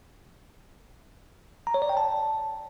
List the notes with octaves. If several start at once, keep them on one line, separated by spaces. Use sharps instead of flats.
A#5
C#5
D5
G5
A5